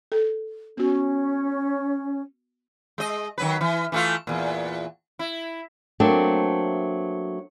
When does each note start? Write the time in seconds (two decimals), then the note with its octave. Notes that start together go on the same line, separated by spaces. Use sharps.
0.12 A4
0.77 B3 C#4 F#4
2.98 G#3 D#5
3.38 D#3 F#3 B4
3.61 E3
3.92 E3 A3 F4
4.27 E2 A#2
5.19 E4
6.00 F#3 A3 A#3 C4 D4